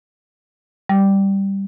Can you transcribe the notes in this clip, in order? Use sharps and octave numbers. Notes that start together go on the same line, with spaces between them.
G3